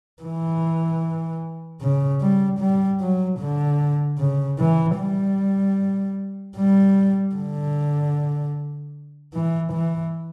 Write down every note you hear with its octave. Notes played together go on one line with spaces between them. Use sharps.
E3
C#3
G3
G3
F#3
D3
C#3
E3
G3
G3
D3
E3
E3